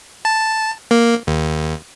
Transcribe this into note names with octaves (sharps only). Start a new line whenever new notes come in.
A5
A#3
D#2